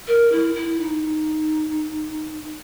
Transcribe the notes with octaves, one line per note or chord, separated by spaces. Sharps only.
A#4
E4
E4
D#4